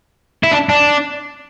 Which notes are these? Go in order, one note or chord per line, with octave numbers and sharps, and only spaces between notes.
E4
D4
D4